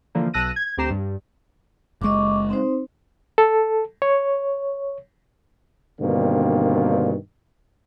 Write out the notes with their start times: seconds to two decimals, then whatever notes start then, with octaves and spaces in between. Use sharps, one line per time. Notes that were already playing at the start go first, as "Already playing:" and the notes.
0.15 D3 E3 F3 A#3
0.34 B1 A5 E6 F#6 A#6 D#7
0.56 G#6
0.77 D2 C4 G4 A#5 C7 E7
0.90 G2
2.01 F#1 G#3 D#5 C#6 D6
2.50 C4 D#4 C5
3.38 A4
4.02 C#5
6.01 G2 B2 D3 D#3 A#3 C4